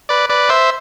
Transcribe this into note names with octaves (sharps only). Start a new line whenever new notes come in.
B4 D5
B4 D5
C5 E5